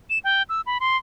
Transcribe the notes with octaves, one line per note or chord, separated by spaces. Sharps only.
E7
G5
E6
B5
C6